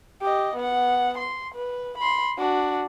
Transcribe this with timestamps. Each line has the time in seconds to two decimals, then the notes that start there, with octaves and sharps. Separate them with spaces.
0.22 G4 D#5
0.56 B3 F#5
1.18 C6
1.55 B4
1.98 B5 C6
2.38 D4 F#4